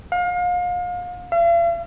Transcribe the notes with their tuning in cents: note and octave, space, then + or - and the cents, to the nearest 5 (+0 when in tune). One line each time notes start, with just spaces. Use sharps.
F5 +35
F5 -45